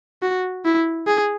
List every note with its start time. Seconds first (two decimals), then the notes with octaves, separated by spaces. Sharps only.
0.22 F#4
0.65 E4
1.07 G#4